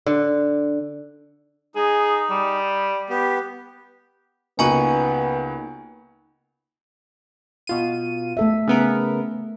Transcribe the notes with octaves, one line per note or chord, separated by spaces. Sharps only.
D3
D#4 G#4
G3
B3 G4
C#2 A#3 B3 D#4 F#4 G#5 A#5 C#6
B2 F4 D#7
A3 A4 E5
C#3 B3 A#4